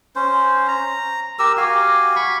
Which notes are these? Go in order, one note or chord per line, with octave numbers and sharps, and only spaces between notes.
C#4 C5
A#5
G4 A#4 E6
F#4 G4 F5 G#5
B5 C#6